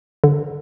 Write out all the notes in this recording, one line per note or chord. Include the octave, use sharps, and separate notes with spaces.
D3